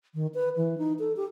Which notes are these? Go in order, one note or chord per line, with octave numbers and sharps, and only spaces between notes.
D#3
B4
E3
D#4
A4
G4